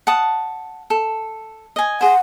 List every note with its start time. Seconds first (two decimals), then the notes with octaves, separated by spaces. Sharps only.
0.07 F#5 A5 D#6
0.90 A4
1.76 D#5 G#5
2.01 G#4 C5 F#5